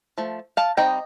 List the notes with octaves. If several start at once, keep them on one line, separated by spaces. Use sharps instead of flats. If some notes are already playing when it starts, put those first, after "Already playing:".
F3 A3
F5 A5
G3 C4 D#4 D#5 G5